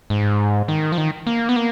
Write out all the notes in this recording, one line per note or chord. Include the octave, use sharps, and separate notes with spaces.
G#2
D#3
F3
D#3
A#3
B3
A#3